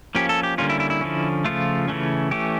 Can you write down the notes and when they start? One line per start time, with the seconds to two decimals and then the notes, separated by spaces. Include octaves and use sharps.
0.15 F3 A#3 C#4 G4
0.29 A4
0.43 G4
0.58 D3 G3 A#3 C#4 F4
0.69 E4
0.80 E4
0.90 E4
1.01 D3 F3 C#4
1.45 C#3 F3 A3 F4
1.88 C#3 E3 A3 C#4
2.31 E3 A3 C#4 G4